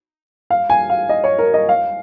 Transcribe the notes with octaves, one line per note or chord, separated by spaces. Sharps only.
F5
G#5
F5
D#5
C#5
A#4
D#5
F5